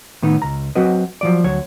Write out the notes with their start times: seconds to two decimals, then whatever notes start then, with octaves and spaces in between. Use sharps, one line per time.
0.23 A2 D#3 B3 D#4
0.42 C#2 A#5
0.75 F#3 C4 F#4 B4 D#5
1.21 F3 F#3 D5
1.44 D2 F#3 C#5